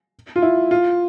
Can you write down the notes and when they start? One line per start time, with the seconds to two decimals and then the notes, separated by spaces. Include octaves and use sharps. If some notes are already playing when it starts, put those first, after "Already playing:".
0.36 F4
0.42 E4
0.71 F4